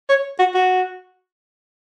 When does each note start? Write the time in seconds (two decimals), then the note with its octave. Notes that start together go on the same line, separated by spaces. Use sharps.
0.09 C#5
0.39 F#4
0.54 F#4